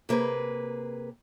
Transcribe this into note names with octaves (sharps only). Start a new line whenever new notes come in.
C3 A#3 G#4 B4